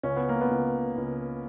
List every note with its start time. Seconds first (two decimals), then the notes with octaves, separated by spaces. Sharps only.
0.03 C#2 C#4
0.16 B3
0.29 A#3
0.41 B3
0.51 C#2
0.97 C#2